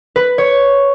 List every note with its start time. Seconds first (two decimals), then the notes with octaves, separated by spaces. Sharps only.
0.16 B4
0.38 C#5